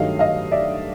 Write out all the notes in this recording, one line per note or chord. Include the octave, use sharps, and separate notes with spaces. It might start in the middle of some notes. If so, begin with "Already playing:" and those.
Already playing: G2 D#3 F#3 A3 D#5 F5
D#5 F5
D5 E5